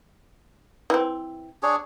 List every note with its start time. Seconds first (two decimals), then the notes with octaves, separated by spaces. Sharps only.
0.90 E3 C4
1.63 D4 G#4 C#5